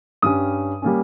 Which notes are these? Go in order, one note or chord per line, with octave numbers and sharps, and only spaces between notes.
G2 G3 C#4 D#6
G3 A#3 C#4